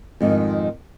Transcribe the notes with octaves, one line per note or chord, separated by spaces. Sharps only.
F2 G#2 D#3